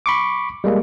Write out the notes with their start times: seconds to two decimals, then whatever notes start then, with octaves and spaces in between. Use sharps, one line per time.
0.06 B5 C#6 D6
0.64 G3 G#3 A#3